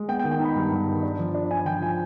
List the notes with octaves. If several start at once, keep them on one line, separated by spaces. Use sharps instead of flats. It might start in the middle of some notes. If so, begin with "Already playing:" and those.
Already playing: G#3
B3 G5
G5
D#3
G5
D#4 B5
G2
G2
D#3
D4
F3
D4
D4 G#5
F3 G5
F3 G#5